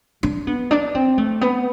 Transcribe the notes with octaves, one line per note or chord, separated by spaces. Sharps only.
D4
B3
D4
C4
A3
B3